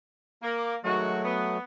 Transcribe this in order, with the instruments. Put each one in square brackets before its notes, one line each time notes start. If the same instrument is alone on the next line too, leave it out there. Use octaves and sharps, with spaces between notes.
[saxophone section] A#3
[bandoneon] D6
[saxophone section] D#3 G#3 F#4 [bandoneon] F#3 A3
[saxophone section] B3